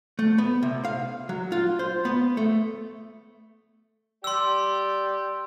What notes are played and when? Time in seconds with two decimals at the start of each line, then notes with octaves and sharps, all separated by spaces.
0.19 A3
0.38 B3
0.63 C3
0.85 F5
1.29 F#3
1.52 F4
1.79 C5
2.05 B3
2.37 A3
4.24 G4 D5 C6 E6